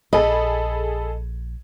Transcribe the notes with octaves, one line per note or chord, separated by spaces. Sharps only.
A#1 G#4 A4 D#5 B5